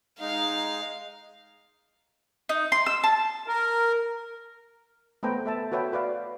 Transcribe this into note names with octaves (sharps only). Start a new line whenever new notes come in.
G#3 D#4 F5
D#4
C6
E6
A5
A#4
A3 B3 B4 C5 G5 A#5
A4 E5 A5
F#4 A4 B4 C#5 E5 G5
F#4 B4 D5 F5